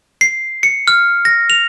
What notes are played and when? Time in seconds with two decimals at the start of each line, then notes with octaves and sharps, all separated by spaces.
0.21 C7
0.63 C#7
0.88 F6
1.25 A#6
1.50 F7